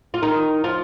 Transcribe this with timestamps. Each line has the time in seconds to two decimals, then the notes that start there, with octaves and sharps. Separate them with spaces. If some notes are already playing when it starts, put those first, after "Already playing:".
0.14 F4
0.22 D#3 D#4
0.64 F3 F4